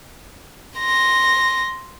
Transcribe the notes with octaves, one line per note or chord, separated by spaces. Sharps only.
C6 A#6